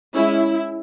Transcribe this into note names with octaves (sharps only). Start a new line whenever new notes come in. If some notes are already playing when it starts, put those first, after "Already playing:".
G#3 C#4 E4